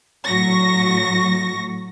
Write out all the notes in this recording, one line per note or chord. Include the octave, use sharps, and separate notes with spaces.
A2 F#3 C#6 A#6